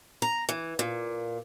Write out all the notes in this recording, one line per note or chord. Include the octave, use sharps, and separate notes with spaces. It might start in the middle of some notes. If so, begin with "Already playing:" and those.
A#5
E3
A#2